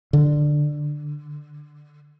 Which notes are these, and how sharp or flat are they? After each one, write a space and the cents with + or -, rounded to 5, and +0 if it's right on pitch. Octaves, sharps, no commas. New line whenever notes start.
D3 +15